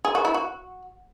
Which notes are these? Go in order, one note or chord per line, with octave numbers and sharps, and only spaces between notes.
G#4
F#4
E4
F#4